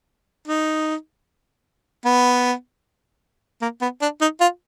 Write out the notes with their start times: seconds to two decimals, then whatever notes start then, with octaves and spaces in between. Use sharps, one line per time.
0.48 D#4
2.05 B3
3.62 A#3
3.81 B3
4.01 D4
4.21 D#4
4.41 F4